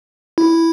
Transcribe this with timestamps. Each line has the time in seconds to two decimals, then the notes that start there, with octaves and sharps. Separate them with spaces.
0.38 E4